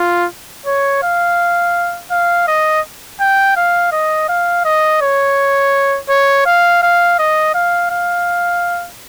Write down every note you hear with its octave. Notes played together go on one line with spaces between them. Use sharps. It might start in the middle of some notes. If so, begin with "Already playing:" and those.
Already playing: F4
C#5
F5
F5
D#5
G5
F5
D#5
F5
D#5
C#5
C#5
F5
F5
D#5
F5
F5